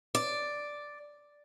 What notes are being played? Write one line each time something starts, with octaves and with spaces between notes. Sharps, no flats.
D5